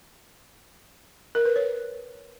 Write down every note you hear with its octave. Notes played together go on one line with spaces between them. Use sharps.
A#4
B4
C#5